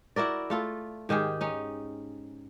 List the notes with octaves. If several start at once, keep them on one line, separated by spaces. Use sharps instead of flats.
E4 F#4 A#4 D5
A3 F4 A4
G#2 D#3 G4 G#4
C#4 D#4